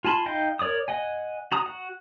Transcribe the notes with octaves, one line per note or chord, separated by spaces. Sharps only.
F4 G#5 A5 B5 C6
D#4 D#5 F5 G5
A#4 C#5 D5 D6 D#6
D#5 F#5 G#5
F#4 A#5 D#6
F#4 F#5